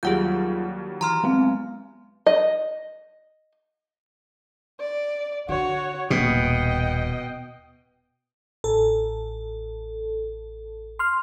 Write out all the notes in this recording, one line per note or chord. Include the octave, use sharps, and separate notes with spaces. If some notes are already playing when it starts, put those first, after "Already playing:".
D#2 F#3 G3 F4 G#4 F#5 G6
E3 A#5 C6 F6
G#3 B3 C4 F5
D#5
D5
D3 F#4 C#5
D#1 D#2 B2 D#5 G5
A1 A4
C6 F6